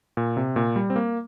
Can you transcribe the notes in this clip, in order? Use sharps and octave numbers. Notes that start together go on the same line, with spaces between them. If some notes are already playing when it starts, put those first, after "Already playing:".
A#2
C3
A#2
G3
C4
A#3